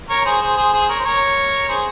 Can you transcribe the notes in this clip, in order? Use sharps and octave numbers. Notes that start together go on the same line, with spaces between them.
A#4 C#5
G#4 C5
G#4 C5
G#4 C5
G#4 C5
A#4 C#5
C5
A#4 C#5
G#4 C5